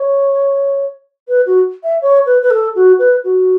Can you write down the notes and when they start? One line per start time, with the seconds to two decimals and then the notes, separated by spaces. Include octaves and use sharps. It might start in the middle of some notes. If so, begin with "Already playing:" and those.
Already playing: C#5
1.28 B4
1.46 F#4
1.83 E5
2.02 C#5
2.26 B4
2.42 B4
2.50 A4
2.75 F#4
2.99 B4
3.24 F#4